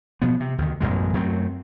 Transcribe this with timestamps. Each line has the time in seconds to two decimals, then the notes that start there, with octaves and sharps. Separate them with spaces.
0.22 B2 F3 B3
0.40 C3
0.58 D2 D#3
0.80 A1 F#2 B2 G#3
1.13 F#2 F#3 A3 C4